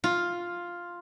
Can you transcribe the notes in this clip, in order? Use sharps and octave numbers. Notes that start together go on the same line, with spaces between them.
F4